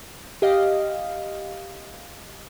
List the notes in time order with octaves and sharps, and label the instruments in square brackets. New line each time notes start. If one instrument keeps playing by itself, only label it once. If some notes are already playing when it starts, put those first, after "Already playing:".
[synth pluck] G4 D#5 F5